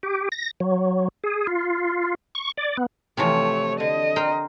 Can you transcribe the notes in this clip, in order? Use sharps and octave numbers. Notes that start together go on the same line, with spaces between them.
G4
A#6
F#3
G#4
F4
C#6
D5
B3
C3 E3 F3 A3 C#5
D3 D#5
A#4 C5 G5